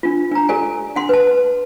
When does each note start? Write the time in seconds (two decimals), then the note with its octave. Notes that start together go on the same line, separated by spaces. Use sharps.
0.03 D4 F4
0.32 D4 A#5
0.49 G4 A4 D5 G#5
0.96 D4 F#5 C6
1.09 B4 A5